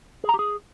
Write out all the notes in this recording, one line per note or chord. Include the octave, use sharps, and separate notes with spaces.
G#4
A#5
G4
G#4